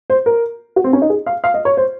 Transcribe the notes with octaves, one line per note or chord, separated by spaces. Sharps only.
C5
A#4
F#4
C4
C#4
D#4
G#4
F5
F5
D#5
C#5
C5